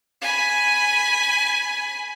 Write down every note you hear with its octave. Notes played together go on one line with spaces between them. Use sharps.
G#5 B5